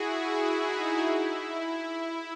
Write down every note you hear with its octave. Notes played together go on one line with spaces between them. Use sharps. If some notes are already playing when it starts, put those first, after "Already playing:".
Already playing: E4 F#4 G#4
E4
D#4
E4